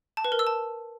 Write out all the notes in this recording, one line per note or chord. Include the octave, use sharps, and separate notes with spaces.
A5
B4
A#4
E6
A5